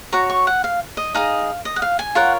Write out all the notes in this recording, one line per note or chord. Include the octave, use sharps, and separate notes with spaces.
F#4 C#5 A#5
C#6
F#5
F5
D#5
D#4 G#4 D#5 F5
D#5
F#5
F5
G#5
F4 A#4 C#5 F#5